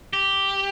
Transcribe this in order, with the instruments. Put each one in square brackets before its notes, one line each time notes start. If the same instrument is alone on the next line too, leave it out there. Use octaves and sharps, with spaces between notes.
[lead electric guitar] G4